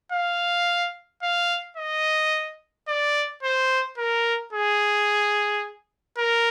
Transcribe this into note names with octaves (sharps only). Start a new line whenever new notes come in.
F5
F5
D#5
D5
C5
A#4
G#4
A#4